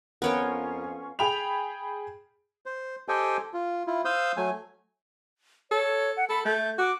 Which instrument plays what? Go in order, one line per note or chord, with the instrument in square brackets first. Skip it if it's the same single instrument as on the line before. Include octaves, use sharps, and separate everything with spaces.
[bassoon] F2 [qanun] B3 C#5 G5 [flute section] C#4 F4 C#6 [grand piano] A#4
[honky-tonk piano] G#4 G5 B5 F7
[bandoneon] C5
G4 A4 C5 D#5 G5 G#5
F4
E4 F4
C5 F5 D#6 E6 G6
F#3 A3 G#5
[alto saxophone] A4 [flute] C#5
[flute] F#5
[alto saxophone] A4 [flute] B5
[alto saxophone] A3 [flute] G6
[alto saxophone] F#4 [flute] D6